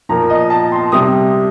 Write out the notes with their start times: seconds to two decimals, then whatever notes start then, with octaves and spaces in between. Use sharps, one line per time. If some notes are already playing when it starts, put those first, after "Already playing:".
0.09 A#2 F3 A#5
0.30 D#5
0.50 A5
0.72 C6
0.92 C3 G3 D#6